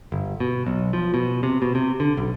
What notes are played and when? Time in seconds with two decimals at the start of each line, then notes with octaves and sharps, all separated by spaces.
0.12 G1
0.40 B2
0.67 B1
0.93 F3
1.14 B2
1.43 C3
1.62 B2
1.75 C3
2.00 D3
2.17 B1